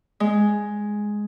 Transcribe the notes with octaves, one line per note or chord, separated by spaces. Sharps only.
G#3